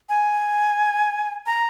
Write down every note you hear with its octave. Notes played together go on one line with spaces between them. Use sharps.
G#5
A#5